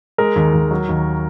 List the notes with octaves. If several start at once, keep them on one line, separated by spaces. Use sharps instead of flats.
G#3 A#4
D#2
D#2
F#3
D#2